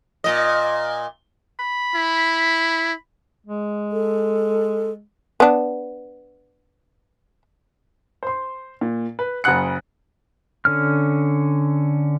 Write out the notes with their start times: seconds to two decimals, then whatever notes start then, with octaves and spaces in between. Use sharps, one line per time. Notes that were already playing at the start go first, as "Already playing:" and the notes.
0.24 A#2 D#5
1.59 B5
1.95 E4
3.47 G#3
3.92 A4
5.40 B3 D4
8.23 C5 C6
8.81 A#2
9.19 B4
9.44 F#1 C#3 F#5 F#6 C#7
10.65 D3 C#4 F6